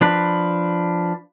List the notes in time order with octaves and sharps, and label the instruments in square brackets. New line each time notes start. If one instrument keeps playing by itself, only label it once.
[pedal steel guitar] F3 D4 B4